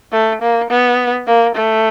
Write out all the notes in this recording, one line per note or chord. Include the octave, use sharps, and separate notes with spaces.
A3
A#3
B3
A#3
A3